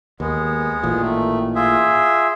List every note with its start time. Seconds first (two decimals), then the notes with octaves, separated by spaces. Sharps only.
0.20 D#2 G#3 B3
0.83 A1 A#2 E3
1.01 D#3 A3
1.55 F4 G#4 E5